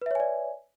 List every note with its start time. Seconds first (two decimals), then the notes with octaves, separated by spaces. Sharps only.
0.02 B4
0.06 E5
0.11 C#5
0.15 G#5
0.20 D5